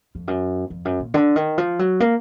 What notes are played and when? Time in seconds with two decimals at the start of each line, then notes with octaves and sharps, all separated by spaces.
0.15 F2
0.28 F#2
0.70 F2
0.85 F#2
1.00 A#2
1.14 D3
1.36 D#3
1.58 F3
1.79 F#3
2.00 A#3